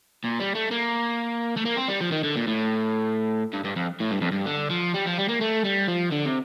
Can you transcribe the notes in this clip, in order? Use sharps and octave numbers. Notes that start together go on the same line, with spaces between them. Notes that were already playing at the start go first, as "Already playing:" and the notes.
A#2
G3
A3
A#3
A3
A#3
C4
G3
F3
D#3
D3
A#2
A2
G2
G2
F2
A2
G2
F2
G2
D3
F3
G3
F3
G3
A#3
A3
G3
F3
D3
C3